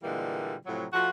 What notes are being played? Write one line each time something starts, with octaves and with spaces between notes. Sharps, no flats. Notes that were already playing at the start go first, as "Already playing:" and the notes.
A#2 D3 E3 G3 G#3 A#3
A2 C3 F3 F#3
F3 A3 F4 F#4